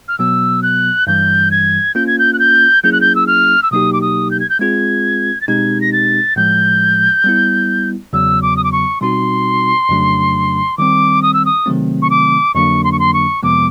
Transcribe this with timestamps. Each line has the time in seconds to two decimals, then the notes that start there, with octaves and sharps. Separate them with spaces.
0.08 F6
0.19 B2 F#3 B3 E6
0.63 F#6
1.07 G2 E3 G3 G6
1.51 G#6
1.95 A#3 C#4 F4 G6
2.07 G#6
2.19 G6
2.33 F#6
2.39 G6
2.83 F#3 A#3 C#4 E4 G#4 G6
2.92 F#6
3.01 G6
3.15 E6
3.27 F6
3.63 E6
3.71 B2 F#3 A#3 D#4 G4 D#6
3.93 D6
4.01 D#6
4.31 G6
4.40 G#6
4.49 G6
4.59 G#3 C4 F4 G#4 G#6
5.41 A6
5.48 B2 G#3 C4 D#4 G4 G#6
5.81 A#6
5.92 A6
6.36 A2 F3 G#3 G6
7.24 G3 B3 E4
8.13 E2 C#3 F#3 B3 E6
8.42 D6
8.57 D#6
8.64 D6
8.72 C#6
9.01 B2 G3 C4 D#4 F#4 C6
9.89 F2 C#3 F#3 A3 D4
10.78 D#3 G3 C4 D6
11.22 D#6
11.34 E6
11.45 D#6
11.66 C3 D#3 F#3 A3 C4
12.02 C#6
12.10 D6
12.54 F2 D3 F#3 A#3 D4 C#6
12.84 C6
12.92 C#6
12.99 C6
13.13 C#6
13.43 F2 C3 F3 G#3 B3 D6